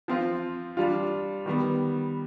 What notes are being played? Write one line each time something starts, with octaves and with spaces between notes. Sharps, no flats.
F3 C4 F4
G3 D4 F4
D#3 G3 B3